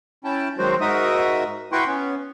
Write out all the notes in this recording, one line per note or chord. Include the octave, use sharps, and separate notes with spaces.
C#4 E4 G5 A5
D#3 F#3 G#3 C4 F#4 C5
G#2 D#4 F#4 A#4 E5 D#6
E4 F#4 B4 G5 C6 C#6
B3 C#4